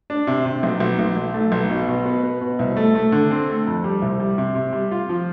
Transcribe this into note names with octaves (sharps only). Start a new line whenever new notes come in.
D4
C3
C3
B1
B1
B1
B1
A3
B1
B2
B2
B3
B3
B2
C2
A3
A3
D3
C4
A3
F2
G3
C2
G3
C3
C3
G3
F4
F3